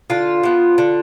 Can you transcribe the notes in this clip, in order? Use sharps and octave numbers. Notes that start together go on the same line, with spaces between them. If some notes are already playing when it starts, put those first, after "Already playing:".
D3 F4
F3 B3
D3